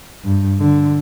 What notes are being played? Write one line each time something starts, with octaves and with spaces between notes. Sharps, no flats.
G2
D3